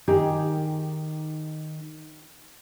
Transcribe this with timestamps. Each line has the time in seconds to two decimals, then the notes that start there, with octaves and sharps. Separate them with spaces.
0.08 D#3 D#4 G4 G#4